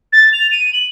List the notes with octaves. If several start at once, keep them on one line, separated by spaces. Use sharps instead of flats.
A6
F7
D#7
F#7